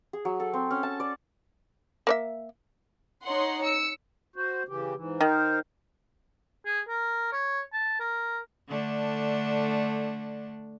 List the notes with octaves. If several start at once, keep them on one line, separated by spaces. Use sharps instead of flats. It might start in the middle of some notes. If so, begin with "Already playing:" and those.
G#4
F#3
A4
C4
C#4
A5
D5
A#3 C#5 E5
D#4 C#5 F#5 C6
E6 C#7
F#4 C5
C#3 E3 G4
G#2 E3
D#3 D#4 A#4 C5
G#4
A#4
C#5
A5
A#4
D3 A3 D4